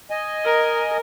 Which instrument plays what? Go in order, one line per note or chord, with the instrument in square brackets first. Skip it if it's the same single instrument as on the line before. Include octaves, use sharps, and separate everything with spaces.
[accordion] D#5 G#5
[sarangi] A#4